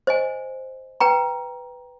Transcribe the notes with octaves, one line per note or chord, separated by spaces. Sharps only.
C5 D#5 G#5
B4 G5 A#5